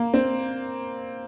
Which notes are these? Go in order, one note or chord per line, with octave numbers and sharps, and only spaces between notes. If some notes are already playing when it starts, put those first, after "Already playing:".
Already playing: A#3
C4